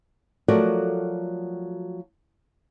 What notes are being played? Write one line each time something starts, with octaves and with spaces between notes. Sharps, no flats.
F3 F#3 A3 F#4 A#4 D5